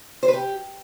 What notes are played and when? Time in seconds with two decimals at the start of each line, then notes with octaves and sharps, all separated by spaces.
0.23 C5
0.28 B4
0.33 G4